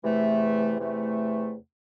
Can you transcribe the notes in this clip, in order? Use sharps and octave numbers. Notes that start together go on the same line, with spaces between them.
E2 C3 E3 A3
E2 C3 E3 A3